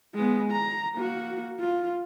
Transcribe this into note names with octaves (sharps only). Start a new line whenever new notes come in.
G#3 B3
A#5
A#3 F#4
F4